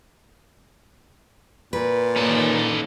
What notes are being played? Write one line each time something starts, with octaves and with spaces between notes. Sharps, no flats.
A#2 B4
D#3 A#3 C#4 D#4 A4